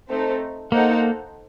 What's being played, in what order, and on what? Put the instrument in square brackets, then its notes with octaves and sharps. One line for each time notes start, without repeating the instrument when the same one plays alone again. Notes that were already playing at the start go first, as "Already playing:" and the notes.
[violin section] A3 C4 D#4 A4 C5
[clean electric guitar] A#3 [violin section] D#4 A4 C5 F#5